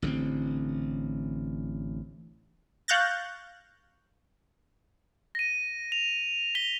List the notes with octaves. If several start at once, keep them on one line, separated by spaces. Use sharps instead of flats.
A1 D3 A#3 C4
F5 C#6 F#6 G6 A6 A#6
A#6 D#7
F7
B6 F7 G7